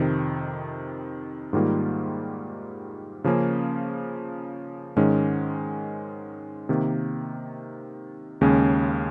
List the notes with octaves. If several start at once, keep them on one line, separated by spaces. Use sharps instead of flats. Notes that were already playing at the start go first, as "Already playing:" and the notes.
Already playing: F2 C3 D#3
G#2 D#3 G3 A#3 F4
C#3 F3 A#3 C#4
G#2 D#3 G#3 C#4
C3 D#3 A#3
D#2 C#3 G#3 C#4